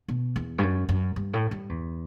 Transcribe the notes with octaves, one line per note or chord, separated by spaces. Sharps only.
B2
E2
G2
F#2
F#2
G2
A2
G2
E2